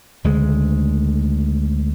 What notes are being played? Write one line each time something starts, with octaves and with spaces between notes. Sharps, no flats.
D2 C#3 G#3